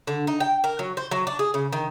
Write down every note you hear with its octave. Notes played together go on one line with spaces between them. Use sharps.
D3
D#4
G5
A#4
F#3
C5
F#3
D4
G#4
C#3
D#3